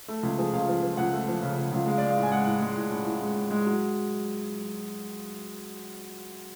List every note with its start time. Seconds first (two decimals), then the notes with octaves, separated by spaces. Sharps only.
0.08 A3
0.23 C#2
0.38 F3 G#4
0.53 C#2 F5
0.69 F3
0.83 F3
0.97 C#2 F#5
1.13 A3
1.28 F3
1.42 C#3
1.57 C#3
1.72 C#2
1.87 G#3 F5
1.98 G#3 D5
2.08 F5
2.17 A2
2.23 G#5
2.31 G#3 F#5
2.47 A2
2.62 G#3
2.77 A2
2.91 A2
3.07 A2
3.22 G#3
3.36 A2
3.51 G#3
3.66 F#3